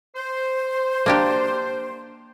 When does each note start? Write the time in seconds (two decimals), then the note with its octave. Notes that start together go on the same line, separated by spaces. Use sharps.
0.16 C5
1.06 A#3 D4 G4